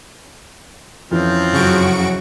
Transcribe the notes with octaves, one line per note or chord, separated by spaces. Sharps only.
F2 E3 F3 C4 C#4 F4
F#2 C#3 F#4 C#6 D7